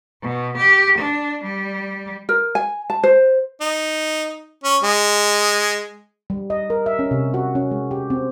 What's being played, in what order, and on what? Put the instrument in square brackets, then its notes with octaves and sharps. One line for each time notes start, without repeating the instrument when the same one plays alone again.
[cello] B2
G4
D4
G3
[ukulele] A#4
G#5
A5
C5
[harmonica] D#4
C#4
G#3
[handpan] G3
D#5
A#4
E5
C#4
C3
F#4
C#4
G#3
G4
C4